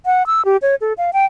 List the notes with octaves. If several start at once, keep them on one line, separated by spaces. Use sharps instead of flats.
F#5
E6
G4
C#5
A4
F5
G5